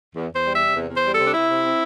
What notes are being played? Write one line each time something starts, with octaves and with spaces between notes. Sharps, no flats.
E2
E2
C5
G3
E5
C3
E2
E2
C5
G3
A4
C3
D4
C3 E4
C3
C4